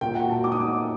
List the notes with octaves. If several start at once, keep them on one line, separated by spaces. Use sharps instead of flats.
A#2 G5
F#5
F#4
A5
D#4 D6
D#6
D#4 D6